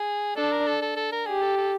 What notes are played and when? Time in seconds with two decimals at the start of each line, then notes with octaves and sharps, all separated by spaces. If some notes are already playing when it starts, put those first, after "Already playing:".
Already playing: G#4
0.36 D4 A4
0.52 A#4
0.67 A4
0.82 A4
0.96 A4
1.12 A#4
1.27 G4 G#4
1.42 A4
1.57 A4